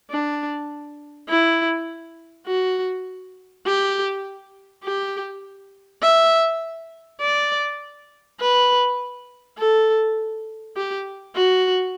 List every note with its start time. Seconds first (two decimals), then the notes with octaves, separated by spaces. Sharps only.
0.11 D4
1.29 E4
2.47 F#4
3.66 G4
4.84 G4
6.03 E5
7.21 D5
8.40 B4
9.58 A4
10.76 G4
11.35 F#4